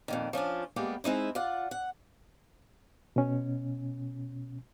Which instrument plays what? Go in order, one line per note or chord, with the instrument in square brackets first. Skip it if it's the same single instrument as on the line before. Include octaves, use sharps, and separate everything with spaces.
[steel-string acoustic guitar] F2 A#2 D#3
F3 C#4 D4 F4
G3 G#3 A#3 B3 G4
G#3 C4 D#4 E4
F4 D5 F#5
F#5
[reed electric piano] B2 C#4